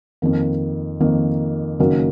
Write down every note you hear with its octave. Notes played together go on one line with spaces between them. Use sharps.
F2 D#3 A#3
F2 D#3 A#3
F#1 F#2 D#3 F#3 A#3